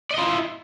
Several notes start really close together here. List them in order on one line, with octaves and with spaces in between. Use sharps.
D5 D#5 F4 E4